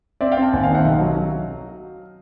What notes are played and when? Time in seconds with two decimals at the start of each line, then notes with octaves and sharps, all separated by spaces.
0.21 C4 D5 E5
0.32 F5 G5
0.37 C4
0.42 G5 A5
0.53 D#2 F#5 G#5
0.64 F5 G5
0.69 D#3
0.75 E5 F#5
0.85 B1 D#5 F5
1.01 F#3
1.17 F#3